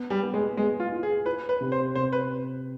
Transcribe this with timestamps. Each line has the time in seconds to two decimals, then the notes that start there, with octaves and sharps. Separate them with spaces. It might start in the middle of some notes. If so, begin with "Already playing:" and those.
Already playing: B3
0.10 G3
0.23 B3
0.34 G#3
0.57 G#3 B3
0.80 F4
0.92 F4
1.03 G#4
1.26 F4 B4
1.49 B4
1.61 C3
1.72 C5
1.95 C3 C5
2.12 B4